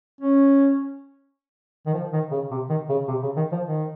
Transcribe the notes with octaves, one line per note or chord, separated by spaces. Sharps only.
C#4
D#3
F3
D#3
C#3
C3
D#3
C#3
C3
C#3
D#3
F3
D#3